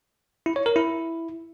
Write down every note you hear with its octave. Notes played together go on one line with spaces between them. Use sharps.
E4
C#5
A#4
E4